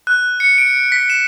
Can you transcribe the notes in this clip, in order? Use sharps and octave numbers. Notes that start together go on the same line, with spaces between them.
F#6
C#7
D7
B6
E7